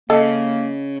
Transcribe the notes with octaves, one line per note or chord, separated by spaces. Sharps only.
C#3 A#3 A4 D#5